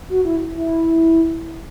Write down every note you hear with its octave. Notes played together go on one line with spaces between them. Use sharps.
F#4
E4
E4